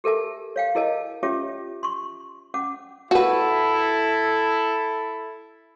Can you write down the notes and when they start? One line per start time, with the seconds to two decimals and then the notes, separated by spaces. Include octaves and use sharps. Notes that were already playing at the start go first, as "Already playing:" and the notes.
0.04 G4 A4 A#4 E5 A5
0.56 C#5 F5 G5
0.75 E4 G#4 A#4 D#5 A5
1.23 C#4 F4 G4 C#5 E5 D6
1.83 C6 C#6
2.54 C#4 F#5 D6
3.11 E4 F#4 A4 B4